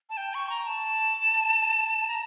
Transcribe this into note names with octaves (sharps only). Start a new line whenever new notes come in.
A5
G5
C#6
A#5
A5
A#5